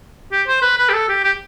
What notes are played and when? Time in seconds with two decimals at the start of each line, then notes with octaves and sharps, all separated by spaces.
0.32 G4
0.48 C5
0.62 B4
0.78 B4
0.89 G4
0.93 A4
1.09 G4
1.24 G4